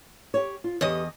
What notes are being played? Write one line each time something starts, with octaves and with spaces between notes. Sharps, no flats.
G4 C#5
F4
E2 G4 B4 C#5 D#5